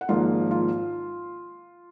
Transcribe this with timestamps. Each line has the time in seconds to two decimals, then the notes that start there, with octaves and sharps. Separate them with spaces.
0.01 F#5
0.09 G#1 G#2 F3 A#3 F4 F5
0.51 F4 F5